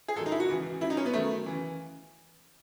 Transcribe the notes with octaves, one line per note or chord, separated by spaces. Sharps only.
G#4
G#2 D#3 F#3 A4
D#4
E4
F#4
C#2 C#3 E3
C#2 C#3 F#3 E4
D#4
C#4
B3
F#2 D#3 F#3 A3
C#3 E3